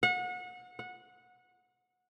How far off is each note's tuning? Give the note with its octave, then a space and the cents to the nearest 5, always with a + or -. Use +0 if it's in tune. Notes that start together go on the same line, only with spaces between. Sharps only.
F#5 -30
F#5 -20